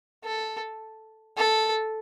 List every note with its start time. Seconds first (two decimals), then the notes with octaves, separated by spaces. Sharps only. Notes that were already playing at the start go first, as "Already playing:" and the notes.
0.24 A4
1.37 A4